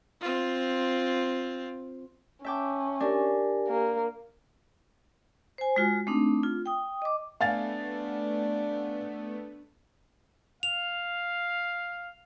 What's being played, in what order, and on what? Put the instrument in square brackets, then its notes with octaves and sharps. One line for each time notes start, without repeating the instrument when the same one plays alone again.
[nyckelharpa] C4 F4
[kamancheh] C#4 [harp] E5 G5 D6 [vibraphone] A5
[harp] D4 [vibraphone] G4 A#4 G#5
[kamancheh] A#3
[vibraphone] C5 G#5
G#3 F4 F#4
A3 C4 D4 D#4
F4
G5 D#6
D#5 D6
[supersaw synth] A3 B3 [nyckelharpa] D4 D5 [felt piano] F5 G#5 A6
[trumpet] F5 [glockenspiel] F7